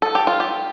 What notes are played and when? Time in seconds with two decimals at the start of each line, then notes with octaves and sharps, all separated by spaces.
0.02 A4
0.15 G4
0.27 F4
0.40 G4